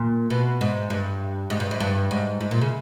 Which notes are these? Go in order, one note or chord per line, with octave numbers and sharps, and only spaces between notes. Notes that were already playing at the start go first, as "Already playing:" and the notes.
Already playing: A#2
B2
G#2
G2
G#2
G2
G#2
G2
G#2
G#2
A#2
C#3